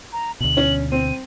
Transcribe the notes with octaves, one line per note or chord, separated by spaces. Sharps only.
A#5
D2 B2 F#7
C#4
C4 D#7